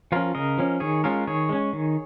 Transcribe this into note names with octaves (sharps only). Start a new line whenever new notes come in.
F3 C#4 F4 A#4
C#3 A#4 D#5
F3 C#4
D#3 G#4 C#5
G#3 C#4 F4 A#4
D#3 G#4 C#5
G#3 C#4
D#3